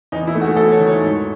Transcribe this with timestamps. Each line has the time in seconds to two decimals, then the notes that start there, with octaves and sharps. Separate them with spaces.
0.12 E2 D#4
0.27 E4
0.35 A3
0.41 F#4
0.56 E2 A4
0.71 C#5
0.79 D#3
0.87 C#5
1.02 G#2 C#5